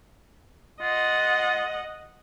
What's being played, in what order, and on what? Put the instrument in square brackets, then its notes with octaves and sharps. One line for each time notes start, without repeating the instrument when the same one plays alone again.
[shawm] F4 [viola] D#5 F#5